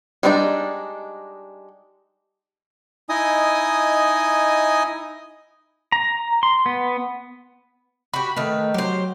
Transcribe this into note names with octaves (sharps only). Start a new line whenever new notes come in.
G3 G#3 C4 D4 D#4
D#4 E4 D#5 G#5 D#6
A#5
C6
B3
F#4 G4 B5
D#3 A3 B4
F#3 G4 C5